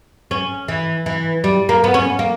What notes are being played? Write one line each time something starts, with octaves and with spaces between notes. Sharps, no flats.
C#4
E3
E3
G3
A#3
B3
C#4
A#3